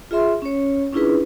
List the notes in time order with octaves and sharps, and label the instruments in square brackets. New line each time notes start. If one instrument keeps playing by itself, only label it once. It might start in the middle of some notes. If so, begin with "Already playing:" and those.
[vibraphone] F4 G#4 E5 C6
C#4 C#5
C#4 D4 E4 F4 G#4 B4